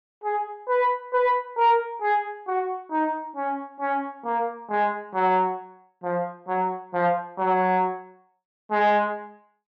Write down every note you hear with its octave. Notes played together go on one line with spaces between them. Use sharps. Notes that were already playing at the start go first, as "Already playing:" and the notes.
G#4
B4
B4
A#4
G#4
F#4
D#4
C#4
C#4
A#3
G#3
F#3
F3
F#3
F3
F#3
G#3